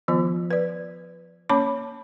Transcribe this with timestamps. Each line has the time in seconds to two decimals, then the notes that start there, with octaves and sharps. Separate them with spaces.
0.08 D#3 F3 B3 F4
0.51 B4 D5
1.49 A#3 C#4 C#5 A5 B5 D6